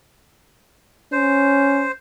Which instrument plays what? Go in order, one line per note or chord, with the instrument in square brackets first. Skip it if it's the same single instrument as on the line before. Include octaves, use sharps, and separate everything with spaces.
[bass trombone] C#4 [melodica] C5